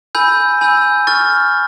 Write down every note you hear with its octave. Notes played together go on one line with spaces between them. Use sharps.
G#5 B5 E6 G6
G#5 B5 E6 G6
C#6 F6 A6